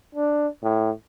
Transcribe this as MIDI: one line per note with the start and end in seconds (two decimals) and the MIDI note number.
0.15 0.47 62
0.63 0.90 45